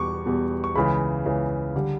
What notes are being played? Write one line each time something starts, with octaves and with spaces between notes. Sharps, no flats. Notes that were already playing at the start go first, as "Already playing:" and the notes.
Already playing: E2 B2 G3 C#6 D6
E2 B2 G3
C#6
C#2 C#3 E3 B5
C#2 C#3 E3
D3 G3